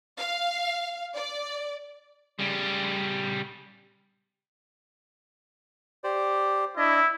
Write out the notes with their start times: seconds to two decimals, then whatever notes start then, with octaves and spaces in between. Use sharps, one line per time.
0.18 F5
1.15 D5
2.39 C#3 G3
6.04 G4 C5 D5
6.77 D4 E4 D#5